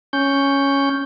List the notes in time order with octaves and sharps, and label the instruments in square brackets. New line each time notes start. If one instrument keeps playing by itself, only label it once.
[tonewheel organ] C#4 G6